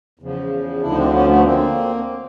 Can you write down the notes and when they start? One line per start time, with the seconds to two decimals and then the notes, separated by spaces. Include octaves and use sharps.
0.19 E2 C#3 F3
0.81 D2 D3 F3 D4 E4
0.91 D#4
0.98 C4 D4
1.13 B3 C#4
1.28 A3 B3
1.44 A#3 C4